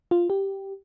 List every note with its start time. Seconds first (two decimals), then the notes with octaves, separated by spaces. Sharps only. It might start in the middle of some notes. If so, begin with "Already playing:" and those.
0.11 F4
0.30 G4